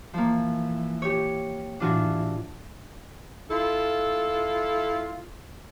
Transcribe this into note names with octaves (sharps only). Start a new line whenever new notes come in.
E3 F3 A#3
G4 C#5
A2 E3 D4 F4 F#4
E4 F4 A4